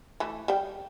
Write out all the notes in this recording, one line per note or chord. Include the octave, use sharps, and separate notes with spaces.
E3 A3
G3 G5